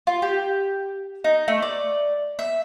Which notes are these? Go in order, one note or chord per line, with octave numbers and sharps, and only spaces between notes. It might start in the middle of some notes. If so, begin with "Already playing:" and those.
F4
G4
D#4
A3
D5
E5